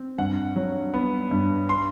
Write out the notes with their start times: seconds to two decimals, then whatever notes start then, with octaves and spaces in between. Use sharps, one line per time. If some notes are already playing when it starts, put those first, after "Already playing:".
Already playing: C4
0.18 G2 F#5
0.56 F#3
0.94 B3
1.31 G2
1.69 C6